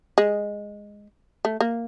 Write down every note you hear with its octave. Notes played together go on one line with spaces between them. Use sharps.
G#3
A3
A#3